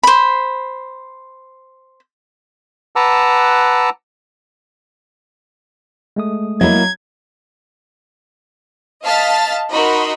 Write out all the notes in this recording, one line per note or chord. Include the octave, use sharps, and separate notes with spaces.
C5 B5
B4 F#5 A5 A#5 D6 E6
G#3 A3 D#6
F#3 A#3 E4 D#5 G#6
D#5 F5 A5 F6 A6 B6
D#4 F#4 A#4 D#5 B5 C6